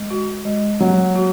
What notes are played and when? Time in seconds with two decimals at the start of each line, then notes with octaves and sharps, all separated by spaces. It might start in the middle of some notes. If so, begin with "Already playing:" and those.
Already playing: G#3
0.11 F#4
0.45 G#3
0.80 F#3 A#3
1.16 F#4